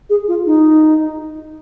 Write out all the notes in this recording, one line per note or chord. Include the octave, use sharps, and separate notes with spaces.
G#4
F4
D#4